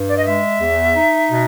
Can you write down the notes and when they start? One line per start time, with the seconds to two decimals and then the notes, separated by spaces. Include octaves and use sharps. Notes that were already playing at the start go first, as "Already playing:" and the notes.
Already playing: G2
0.09 D5
0.17 D#5
0.25 G#3 E5
0.60 E2
0.94 D#4
1.29 B2